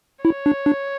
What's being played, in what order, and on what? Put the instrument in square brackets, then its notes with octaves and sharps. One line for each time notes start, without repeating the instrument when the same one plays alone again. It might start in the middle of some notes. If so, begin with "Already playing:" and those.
[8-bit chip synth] E4 [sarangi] C#5
[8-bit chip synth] D4
D4